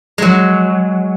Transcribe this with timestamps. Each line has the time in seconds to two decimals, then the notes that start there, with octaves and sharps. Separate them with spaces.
0.18 F#3 G#3